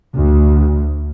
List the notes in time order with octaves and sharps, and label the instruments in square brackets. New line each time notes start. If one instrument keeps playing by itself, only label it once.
[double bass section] D2